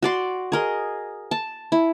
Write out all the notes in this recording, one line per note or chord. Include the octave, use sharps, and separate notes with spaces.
F#4 D5 C6
G#4 A#4 D#5
A5
E4